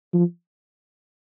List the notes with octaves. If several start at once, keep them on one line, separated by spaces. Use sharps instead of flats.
F3